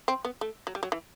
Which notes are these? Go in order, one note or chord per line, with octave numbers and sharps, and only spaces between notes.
C4
B3
A3
F#3
G3
F#3
E3